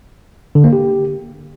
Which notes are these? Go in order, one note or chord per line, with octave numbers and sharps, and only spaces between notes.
D3
A#3
G4